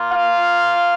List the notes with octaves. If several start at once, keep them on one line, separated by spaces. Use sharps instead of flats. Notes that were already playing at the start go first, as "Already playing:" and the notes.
Already playing: A#3 F4
F5